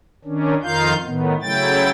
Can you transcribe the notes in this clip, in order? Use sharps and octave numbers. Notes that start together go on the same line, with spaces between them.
D#3 C#4 D4
F2 D#3 D#4 F4 F5 G6
A2 D#3 B3
C#3 F#3 A3 E4 G5 A6